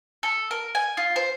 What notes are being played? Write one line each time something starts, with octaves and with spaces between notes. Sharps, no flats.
A4
A#4
G#5
F4
C5